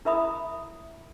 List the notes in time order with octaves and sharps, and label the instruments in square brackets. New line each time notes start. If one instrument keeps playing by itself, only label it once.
[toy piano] E4 A#4 E5 A#5 B5 D#6